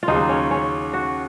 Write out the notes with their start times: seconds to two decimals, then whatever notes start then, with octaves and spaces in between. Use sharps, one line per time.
0.03 F4
0.08 D#2 C#3 F#3 D#4
0.29 C#4
0.51 C#4
0.93 F#4